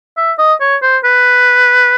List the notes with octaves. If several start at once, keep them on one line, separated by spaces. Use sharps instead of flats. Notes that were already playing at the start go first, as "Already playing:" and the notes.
E5
D#5
C#5
C5
B4